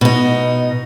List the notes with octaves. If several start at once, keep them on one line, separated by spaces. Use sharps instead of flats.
B2 D#4